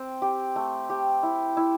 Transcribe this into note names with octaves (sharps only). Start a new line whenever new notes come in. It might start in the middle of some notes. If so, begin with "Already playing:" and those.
Already playing: C4
G4
A3
G4
E4
E4